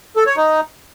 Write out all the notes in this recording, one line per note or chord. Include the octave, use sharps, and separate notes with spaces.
A4
C#5
D#4